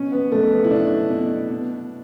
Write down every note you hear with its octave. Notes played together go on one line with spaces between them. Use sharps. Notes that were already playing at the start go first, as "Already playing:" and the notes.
Already playing: B2 C#4
B3
B2 A3
B3
E4
B2 D4
B2
B2